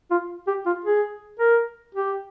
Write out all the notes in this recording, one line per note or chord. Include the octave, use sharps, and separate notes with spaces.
F4
G4
F4
G#4
A#4
G4